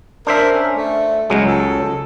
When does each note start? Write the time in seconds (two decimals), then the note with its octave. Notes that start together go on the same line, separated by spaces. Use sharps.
0.27 D4 A#4 C5 E5
0.53 C#4
0.76 A3
1.30 C#2 F#3 G#3
1.47 A4